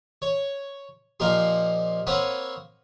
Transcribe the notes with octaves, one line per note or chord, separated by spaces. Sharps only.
C#5
A#2 F3 A#3 D#4 G4 C6
A#3 C4 C#5 F#5 B5 D#6